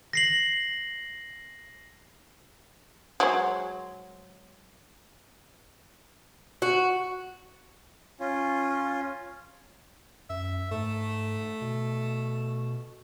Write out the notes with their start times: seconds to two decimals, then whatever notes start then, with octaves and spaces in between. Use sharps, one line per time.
0.13 A#6 C7 F#7
3.20 F#3 G#3 C5
6.62 F#4
8.20 C#4 F4
10.30 F#2 E5
10.71 G#2 A3
11.62 B2